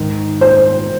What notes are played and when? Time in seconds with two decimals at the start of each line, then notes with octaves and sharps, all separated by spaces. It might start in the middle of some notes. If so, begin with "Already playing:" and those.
Already playing: G#2 D#3
0.41 C5